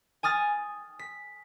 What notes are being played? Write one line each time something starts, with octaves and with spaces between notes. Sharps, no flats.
G#5 D#6 F6 A6
B6